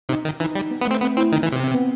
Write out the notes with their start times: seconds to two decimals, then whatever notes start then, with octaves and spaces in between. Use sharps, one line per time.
0.09 C3 D#4
0.25 D#3
0.40 E3 D#4
0.55 G3
0.70 B3
0.81 B3
0.87 A3
0.91 C4
1.01 B3 C4
1.17 C4 E4
1.32 D#3 D#4
1.43 E3
1.52 C3
1.63 C4
1.74 B3